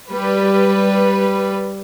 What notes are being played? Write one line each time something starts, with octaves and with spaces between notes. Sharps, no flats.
G3 B4